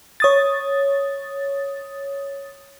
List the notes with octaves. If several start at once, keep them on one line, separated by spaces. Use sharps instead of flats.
C#5 D#6 A6